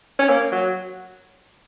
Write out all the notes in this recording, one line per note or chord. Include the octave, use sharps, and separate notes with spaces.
C#4
A#3
F#3